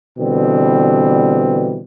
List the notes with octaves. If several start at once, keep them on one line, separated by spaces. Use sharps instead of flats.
B2 D3 E3 G3 C4